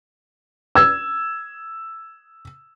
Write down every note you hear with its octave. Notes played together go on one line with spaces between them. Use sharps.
E6 G#6